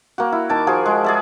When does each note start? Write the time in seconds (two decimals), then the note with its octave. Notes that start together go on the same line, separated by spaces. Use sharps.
0.18 A#3 F#4
0.32 E4
0.49 D#3 A5 D6
0.67 F3 F#4 G#4 A#4
0.86 G#3
1.04 G#4 D5 E5